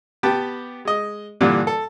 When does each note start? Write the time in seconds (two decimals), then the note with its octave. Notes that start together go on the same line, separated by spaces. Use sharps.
0.23 B3 G4 G5 A5 B5
0.85 G#3 D#5
1.41 G2 A#2 D3 E3 G3
1.67 A4